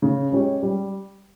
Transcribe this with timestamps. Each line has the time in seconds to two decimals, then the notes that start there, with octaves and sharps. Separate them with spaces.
0.02 C#3
0.32 G#3 C#4 G4 C#5
0.63 G3